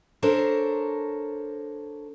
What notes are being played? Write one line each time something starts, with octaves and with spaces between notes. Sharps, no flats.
D4 A4 A#4 C5 C#5